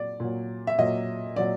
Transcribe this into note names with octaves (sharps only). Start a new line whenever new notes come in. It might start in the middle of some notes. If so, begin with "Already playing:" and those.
Already playing: A#2 F#3 D5
A#2 F#3
E5
A#2 F#3 D#5
A#2 F#3 D5